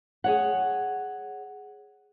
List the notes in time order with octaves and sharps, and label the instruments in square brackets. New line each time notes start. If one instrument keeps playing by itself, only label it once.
[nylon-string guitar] G#4 C#5 F#5